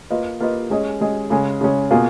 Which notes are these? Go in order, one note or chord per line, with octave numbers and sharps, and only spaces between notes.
A#3 F4 B4 D#5
A#3 F4 B4 D#5
G#3 C#4 G#4 D#5
G#3 C#4 G#4 D#5
C#3 G#3 C#4 G#4
C#3 G#3 C#4 G#4
B2 A#3 F4 G#4